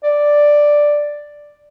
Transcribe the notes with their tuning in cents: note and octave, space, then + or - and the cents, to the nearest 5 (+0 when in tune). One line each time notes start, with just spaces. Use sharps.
D5 +5